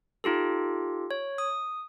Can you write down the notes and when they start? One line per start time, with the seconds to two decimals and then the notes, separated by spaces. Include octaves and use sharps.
0.24 D#4 F4 G4 A4
1.11 C#5
1.38 D#6